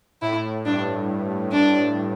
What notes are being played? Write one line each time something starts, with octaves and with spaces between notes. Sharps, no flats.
A2 E4
G2 D4
D4